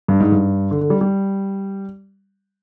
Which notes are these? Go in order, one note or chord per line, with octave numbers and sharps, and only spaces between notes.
G2
G#2
G2
D3
D3
G3
G3